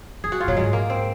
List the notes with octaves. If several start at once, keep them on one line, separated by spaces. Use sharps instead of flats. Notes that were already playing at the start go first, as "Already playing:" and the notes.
F#2 G#4
F#4
F4
A#2 F#3
G#2 G#3
A#3
C4